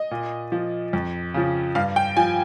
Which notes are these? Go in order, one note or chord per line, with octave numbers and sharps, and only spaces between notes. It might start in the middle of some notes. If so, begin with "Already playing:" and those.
Already playing: D#5
A#2
F3
F2
C#3 F3
G2 F5
G5
F3 G#5